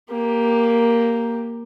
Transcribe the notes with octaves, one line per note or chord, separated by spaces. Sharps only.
A#3 G4